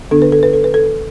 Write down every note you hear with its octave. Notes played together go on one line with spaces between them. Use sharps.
D3 B3 D4 A4
B4
A4
B4
A4
B4
A4